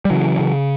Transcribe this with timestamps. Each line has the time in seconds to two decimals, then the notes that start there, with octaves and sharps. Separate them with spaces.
0.05 G3
0.11 C#3 E3 F#3
0.39 C#3